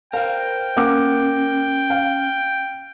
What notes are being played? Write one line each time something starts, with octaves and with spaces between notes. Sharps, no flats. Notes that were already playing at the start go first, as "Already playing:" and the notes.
A#4 C5 F5 G5
A#3 C#4 F#5 D6
F5